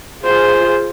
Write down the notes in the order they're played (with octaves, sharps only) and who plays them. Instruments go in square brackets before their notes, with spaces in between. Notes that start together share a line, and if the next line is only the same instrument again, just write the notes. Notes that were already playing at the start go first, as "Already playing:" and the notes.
[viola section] F4 G#4 [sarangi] C5